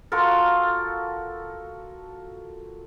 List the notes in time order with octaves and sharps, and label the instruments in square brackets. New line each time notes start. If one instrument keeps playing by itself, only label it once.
[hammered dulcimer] F4 F#4 A4 A#4